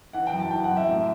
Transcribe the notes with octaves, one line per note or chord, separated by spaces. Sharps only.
E3 F#5
G5
F#2
A5
E3 G5
F#5
F#2
E5
A2